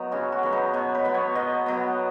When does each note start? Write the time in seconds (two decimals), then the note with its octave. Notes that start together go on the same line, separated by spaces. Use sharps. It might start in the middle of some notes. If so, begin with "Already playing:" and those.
Already playing: F#3 B3 D#4
0.12 C#3 F#4
0.32 F#4
0.43 F#3 B3
0.52 D#4
0.73 B2 C#5
0.95 B4
1.05 F#3 B3
1.14 C#5
1.35 B2 D#5
1.66 F#3 B3